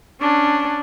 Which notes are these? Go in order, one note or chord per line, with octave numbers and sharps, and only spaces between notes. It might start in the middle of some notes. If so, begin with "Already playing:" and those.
C#4 D4